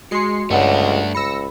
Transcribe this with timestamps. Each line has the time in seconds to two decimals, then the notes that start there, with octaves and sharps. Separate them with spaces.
0.11 G#3 F#4 C6 C7 C#7
0.50 C#2 G2 A3 D4 C#5 F#5
1.15 C#2 B5 E6 A#6 C#7